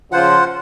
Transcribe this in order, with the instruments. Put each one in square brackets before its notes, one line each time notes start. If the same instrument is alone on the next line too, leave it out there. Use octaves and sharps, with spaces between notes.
[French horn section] C#3 F3 [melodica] F4 C5 F#5